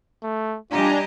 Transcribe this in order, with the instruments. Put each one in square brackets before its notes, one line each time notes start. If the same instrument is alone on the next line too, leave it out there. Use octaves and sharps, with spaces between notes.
[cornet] A3
[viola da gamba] G3 G4 D#5 [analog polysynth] D4 G#5 A#5 [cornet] F4